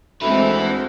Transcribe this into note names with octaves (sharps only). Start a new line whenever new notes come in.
D2 G#3 A3 C4 E4 B4